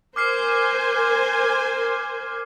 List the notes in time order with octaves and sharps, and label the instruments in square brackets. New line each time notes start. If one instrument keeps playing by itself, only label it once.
[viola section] A#4 C5 G#5 [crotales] D6 F6 C7